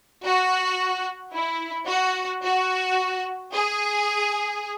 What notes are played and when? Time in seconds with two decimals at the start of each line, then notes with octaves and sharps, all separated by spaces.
0.24 F#4
1.33 E4
1.88 F#4
2.43 F#4
3.53 G#4